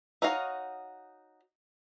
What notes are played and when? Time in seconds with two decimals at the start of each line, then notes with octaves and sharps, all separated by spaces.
0.22 D#4 F#4 C#5 D#5 F5